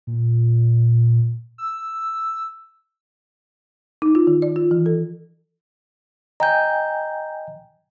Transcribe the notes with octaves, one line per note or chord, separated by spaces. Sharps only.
A#2
E6
D#4
F4
D#3
D5
F4
E3
A4
D#5 G5 G#5 A#5 G6